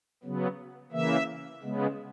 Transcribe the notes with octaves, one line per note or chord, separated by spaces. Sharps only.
C#3 F#3 B3
C#3 E3 A#3 E5
C#3 G#3 B3